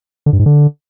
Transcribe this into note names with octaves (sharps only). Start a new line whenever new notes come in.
D3
G2
G#2
D3